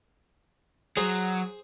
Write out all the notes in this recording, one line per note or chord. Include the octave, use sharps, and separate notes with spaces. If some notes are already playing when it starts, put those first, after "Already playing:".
F#3 G#4 C5